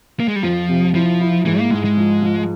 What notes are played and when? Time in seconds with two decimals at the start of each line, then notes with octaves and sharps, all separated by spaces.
0.20 A#3
0.28 G#3
0.36 G3
0.43 F2 F3
0.68 C3
0.94 F3 E4
1.21 E4
1.46 G#2 E3
1.59 A#3
1.71 G#2 G#3
1.84 G#3
1.97 F3
2.22 F3